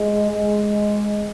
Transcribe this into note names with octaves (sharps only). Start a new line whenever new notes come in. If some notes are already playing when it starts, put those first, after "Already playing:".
Already playing: G#3
G#3